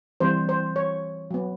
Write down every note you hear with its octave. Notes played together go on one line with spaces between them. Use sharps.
E3 G3 C4 C5
C5
C#5
F#3 B3